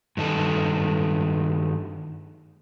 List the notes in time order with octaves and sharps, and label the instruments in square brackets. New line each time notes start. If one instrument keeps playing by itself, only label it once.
[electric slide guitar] G2 D#3 A4